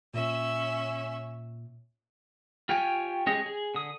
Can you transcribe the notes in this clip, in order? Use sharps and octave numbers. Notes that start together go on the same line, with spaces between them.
A#2 C#4 E5
F4 G4 C#5 G5 G#5
G#3 C#4 G4 G#4 D#5
G#4
D3 D#6